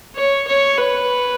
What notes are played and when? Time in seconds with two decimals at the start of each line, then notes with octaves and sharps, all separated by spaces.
0.16 C#5
0.48 C#5
0.78 B4